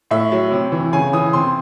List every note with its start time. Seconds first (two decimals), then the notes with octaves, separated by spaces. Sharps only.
0.11 A2 E5
0.32 F#3
0.51 C3
0.72 E3
0.93 C#3 G#5
1.13 E3 D#6
1.33 C3 C6